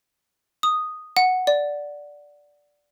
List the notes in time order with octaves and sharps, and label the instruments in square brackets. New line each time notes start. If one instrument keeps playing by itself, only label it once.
[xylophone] D#6
F#5
D5